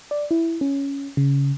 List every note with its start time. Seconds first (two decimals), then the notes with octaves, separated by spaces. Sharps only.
0.11 D5
0.31 E4
0.61 C#4
1.17 C#3